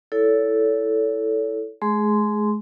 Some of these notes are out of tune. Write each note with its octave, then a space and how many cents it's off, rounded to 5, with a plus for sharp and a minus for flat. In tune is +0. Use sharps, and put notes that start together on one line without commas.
E4 +0 A4 +0 C#5 +35
G#3 +40 G#4 +0 C6 -15